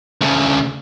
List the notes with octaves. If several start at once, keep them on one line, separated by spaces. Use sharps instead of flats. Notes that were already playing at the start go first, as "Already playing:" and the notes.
D2 C#3